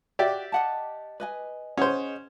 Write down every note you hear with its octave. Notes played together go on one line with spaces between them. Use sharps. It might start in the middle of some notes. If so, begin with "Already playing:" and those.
F#4 G4 D5 E5
D#5 F#5 A5
B4 D#5 G#5
C#4 G#4 C5 D#5 F#5